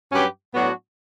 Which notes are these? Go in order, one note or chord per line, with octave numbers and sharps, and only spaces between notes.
G2 F#3 C#4 G4 B4
A2 F#3 B3 D4 F#4